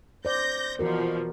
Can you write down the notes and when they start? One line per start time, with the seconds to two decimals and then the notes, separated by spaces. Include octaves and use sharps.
0.25 C5 D5 G6 A#6
0.79 B2 E3 F3 F#4 A#4